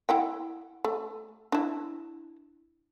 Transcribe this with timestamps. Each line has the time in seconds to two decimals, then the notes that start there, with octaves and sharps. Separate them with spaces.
0.09 E4 F#5 G5
0.84 A3
1.52 D4 E4